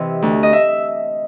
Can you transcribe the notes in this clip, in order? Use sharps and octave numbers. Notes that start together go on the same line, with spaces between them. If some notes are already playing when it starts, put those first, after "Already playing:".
Already playing: C3 E3 D#5
D2
D#5
E5